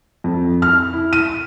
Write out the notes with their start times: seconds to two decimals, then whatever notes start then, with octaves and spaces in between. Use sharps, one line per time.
0.24 F2
0.62 F6
0.93 E4
1.13 D#7